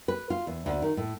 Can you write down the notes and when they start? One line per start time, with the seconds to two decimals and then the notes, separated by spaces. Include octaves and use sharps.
0.08 B4
0.30 F4
0.47 E2
0.66 D2
0.82 D#3
0.97 A2